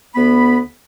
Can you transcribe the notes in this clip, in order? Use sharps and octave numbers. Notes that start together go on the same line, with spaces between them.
D2 B3 B5